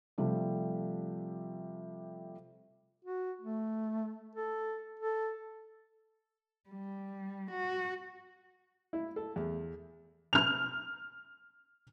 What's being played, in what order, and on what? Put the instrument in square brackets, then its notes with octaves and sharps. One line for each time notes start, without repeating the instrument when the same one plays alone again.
[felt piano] C3 F3 G3 A3
[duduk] F#4
A3
A4
A4
[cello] G3
F#4
[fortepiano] E4
A4
E2
[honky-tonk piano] F6 F7